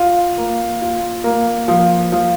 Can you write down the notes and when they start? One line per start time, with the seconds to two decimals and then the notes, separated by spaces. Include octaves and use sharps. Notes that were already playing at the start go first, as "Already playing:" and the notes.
Already playing: F4
0.38 A#3
0.82 F4
1.24 A#3
1.68 F3
2.12 F3